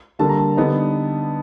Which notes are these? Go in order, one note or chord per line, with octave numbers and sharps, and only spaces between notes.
D3 G3 A#3 A5
A#5
A5
D3 G3 B3 D#4